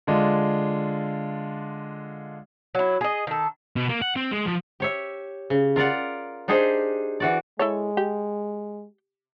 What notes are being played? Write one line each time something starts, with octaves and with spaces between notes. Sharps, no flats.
D3 G#3 D4 F4
F#3 E4
G#4 D#5
D#3 A4
B2
A#3
F#5
C4
G#3
F3
G4 C#5 E5
C#3
F4 A#4 D5 F#5
D4 D#4 G4 G#4 C5
E3 F#4 D5
G#3 E4 A4 C#5
G4